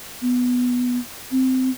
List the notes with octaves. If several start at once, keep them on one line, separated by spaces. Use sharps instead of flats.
B3
C4